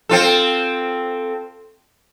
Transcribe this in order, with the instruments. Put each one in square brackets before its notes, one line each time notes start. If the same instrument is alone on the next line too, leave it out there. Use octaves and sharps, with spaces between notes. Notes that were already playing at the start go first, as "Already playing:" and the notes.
[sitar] C4 F4 A4